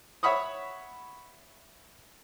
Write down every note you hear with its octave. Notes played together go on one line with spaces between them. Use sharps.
C#5 E5 F#5 B5 C#6 D#6